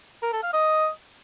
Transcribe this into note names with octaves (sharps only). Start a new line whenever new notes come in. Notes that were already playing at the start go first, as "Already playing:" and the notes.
A#4
A4
F5
D#5